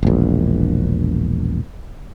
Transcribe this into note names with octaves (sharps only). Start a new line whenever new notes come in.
E1 A#1